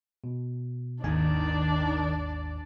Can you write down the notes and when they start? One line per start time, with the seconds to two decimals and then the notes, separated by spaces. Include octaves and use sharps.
0.24 B2
1.03 G#1 D#2 D#3 D4 D5 G#5